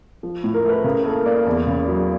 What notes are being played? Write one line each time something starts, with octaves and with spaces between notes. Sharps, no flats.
F3
A2
A#4
A3 B4
C#3 A#4
A#3 A4
A#3 D5
E2
C#3
F#3